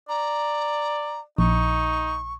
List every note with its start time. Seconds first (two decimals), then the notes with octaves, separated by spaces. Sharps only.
0.09 D5 A#5
1.38 A#1 D#4 C#6